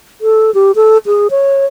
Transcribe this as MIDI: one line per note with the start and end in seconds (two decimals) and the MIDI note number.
0.21 0.53 69
0.54 0.72 67
0.76 0.98 69
1.06 1.28 68
1.31 1.66 73